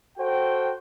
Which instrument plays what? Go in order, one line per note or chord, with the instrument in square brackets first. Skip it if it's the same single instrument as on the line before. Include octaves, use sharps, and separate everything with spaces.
[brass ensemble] F#4 A4 C5 G5